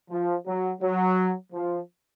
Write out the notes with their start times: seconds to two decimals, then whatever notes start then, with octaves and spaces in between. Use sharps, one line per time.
0.10 F3
0.46 F#3
0.82 F#3
1.53 F3